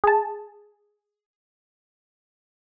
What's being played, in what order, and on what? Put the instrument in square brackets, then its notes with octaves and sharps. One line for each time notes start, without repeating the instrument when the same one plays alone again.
[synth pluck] G#4 A5